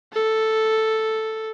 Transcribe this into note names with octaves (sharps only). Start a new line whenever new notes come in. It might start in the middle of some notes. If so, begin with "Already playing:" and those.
A4